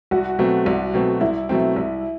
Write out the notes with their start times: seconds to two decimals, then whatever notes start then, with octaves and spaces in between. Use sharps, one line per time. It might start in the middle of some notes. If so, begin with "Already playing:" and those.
0.11 C2 F#4
0.39 B2 F#3 A3 C4
0.66 C2
0.94 B2 F#3 A3 C4
1.21 C2 E4
1.49 B2 F#3 A3 C4
1.76 C2